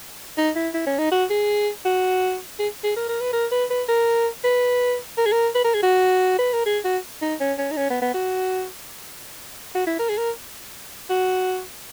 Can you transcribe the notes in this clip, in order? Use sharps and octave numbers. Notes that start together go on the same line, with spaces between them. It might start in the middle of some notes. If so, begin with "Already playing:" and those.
D#4
E4
E4
C#4
D#4
F#4
G#4
F#4
G#4
G#4
A#4
A#4
B4
A#4
B4
B4
A#4
B4
A#4
G#4
A#4
B4
A#4
G#4
F#4
B4
A#4
G#4
F#4
D#4
C#4
C#4
D#4
C#4
B3
B3
F#4
F#4
E4
A#4
G#4
A#4
F#4